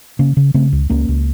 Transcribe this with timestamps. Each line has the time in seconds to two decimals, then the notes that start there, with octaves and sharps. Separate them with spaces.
0.19 C#3 A#3 C#4
0.37 C#3
0.54 C#3 A3 C4
0.72 C#2
0.90 C#2 A#3 C#4
1.08 C#2